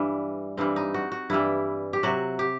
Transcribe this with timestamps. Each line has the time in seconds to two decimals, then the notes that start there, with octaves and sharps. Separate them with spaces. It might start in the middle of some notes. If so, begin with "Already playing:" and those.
Already playing: G2 E3 G3
0.57 G2 E3 G3 C4
0.76 D#4
0.94 F#4
1.12 F#4
1.30 G2 E3 G3 E4
1.93 G4
2.03 C3 F#3 F#4
2.39 G4